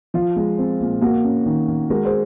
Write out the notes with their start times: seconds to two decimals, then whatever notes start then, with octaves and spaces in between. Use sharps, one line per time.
0.14 F3 F4
0.36 G#3
0.58 C4
0.81 A#2
1.01 A#3 F#4
1.24 C#4
1.46 D#3
1.68 D#3
1.90 G#3 F#4 A#4
2.05 G#4 C5